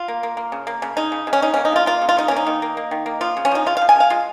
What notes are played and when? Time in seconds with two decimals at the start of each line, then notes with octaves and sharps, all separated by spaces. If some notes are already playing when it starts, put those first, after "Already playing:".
Already playing: F4
0.08 A#3
0.23 A#3
0.37 A#3
0.52 C#3
0.67 A#3
0.82 C#3
0.97 C#3 D#4
1.12 C#3
1.27 C#3
1.33 C#4
1.42 C#3 D#4
1.54 A#3 C#4
1.65 D#4
1.72 C#3 F4
1.86 A#3 F4
2.02 C#3
2.09 F4
2.17 C#3 D#4
2.28 C#4
2.31 A#3
2.37 D#4
2.46 D#3
2.62 A#3
2.77 A#3
2.91 D#3
3.06 A#3
3.21 F3 F4
3.37 C#3
3.45 C#4
3.51 F3 D#4
3.66 C#3 F4
3.77 F3 F5
3.89 G#5
3.96 C#3 F5
4.10 G#3 F4